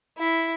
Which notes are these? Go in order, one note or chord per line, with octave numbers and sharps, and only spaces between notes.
E4